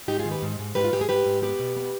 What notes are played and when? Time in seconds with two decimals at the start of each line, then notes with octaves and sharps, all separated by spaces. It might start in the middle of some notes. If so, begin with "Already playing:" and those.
0.08 G#2 D#4 G4
0.19 F4 G#4
0.25 D#3
0.31 G4 B4
0.42 G#2
0.59 G#2
0.75 G#2 G4 B4
0.84 F4
0.92 G#2 G4
1.01 G#4
1.09 G#2 G4 B4
1.26 G#2
1.42 B3 G4 B4
1.59 B2
1.76 B3